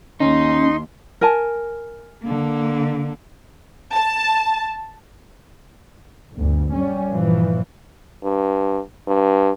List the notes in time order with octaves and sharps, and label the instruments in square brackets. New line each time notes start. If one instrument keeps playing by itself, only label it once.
[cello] D#2 [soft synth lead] C#4 [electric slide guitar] D#4 [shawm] C6
[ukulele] A#4 G#5 A5
[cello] D3 A#3
[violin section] A5
[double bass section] G1 D2
G3 C#4
G2 A#2 E3 F3
[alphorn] G2
G2